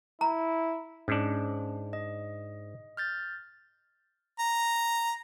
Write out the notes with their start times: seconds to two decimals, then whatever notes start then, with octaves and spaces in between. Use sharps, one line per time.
0.21 E4 A#5
1.08 G#2 C#4 D4
1.93 D#5
2.97 F6 G6 A6
4.39 A#5